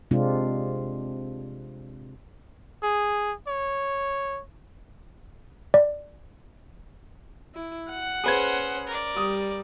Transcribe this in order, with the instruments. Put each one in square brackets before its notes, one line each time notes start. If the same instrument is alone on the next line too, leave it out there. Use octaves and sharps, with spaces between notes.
[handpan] C3 G#3 C4 D4 F4
[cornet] G#4
C#5
[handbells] D5
[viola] E4
F#5
[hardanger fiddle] C#4 C5 [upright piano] G#4 B4 G#6
[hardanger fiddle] A#4 D5
[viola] G3 [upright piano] D#6